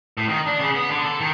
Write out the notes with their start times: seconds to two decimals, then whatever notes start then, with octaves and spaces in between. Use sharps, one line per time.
0.17 A2
0.29 D#3
0.46 D4
0.59 C#3
0.75 B3
0.90 D3
1.05 A4
1.20 D#3